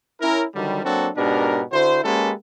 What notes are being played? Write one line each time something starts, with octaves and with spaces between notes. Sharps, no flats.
C#4 E4 A#4
D3 D#3 F#3 G3
F#3 A#3 C4 D4 F#4 A4
G#2 B2 D4 G4 A#4
D3 E4 F#4 C5
G#3 A#3 C#4 G4 A4 B4